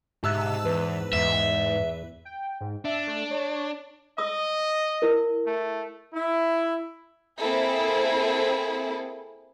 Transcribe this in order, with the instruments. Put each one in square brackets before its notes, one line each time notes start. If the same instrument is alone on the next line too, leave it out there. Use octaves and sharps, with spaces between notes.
[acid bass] G#2 [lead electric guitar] G4 E5 [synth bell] A5 E6 F#6
[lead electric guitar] E2 [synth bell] B4
[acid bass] E2 [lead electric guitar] G#2 [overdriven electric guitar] E5
[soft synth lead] G5
G#2
[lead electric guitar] D4 [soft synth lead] E5
[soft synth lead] A3
C#5
[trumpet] D#5 [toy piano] D#6 E6
[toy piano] E4 A#4
[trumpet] A3
[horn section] E4
[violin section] A#3 C4 E4 G#4 A4